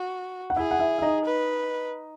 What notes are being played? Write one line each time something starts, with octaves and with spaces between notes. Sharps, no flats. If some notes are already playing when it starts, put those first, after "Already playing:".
Already playing: F#4
F#5
E4 G#4 E5
F#5
E4 E5
E5
D#4 D#5
B4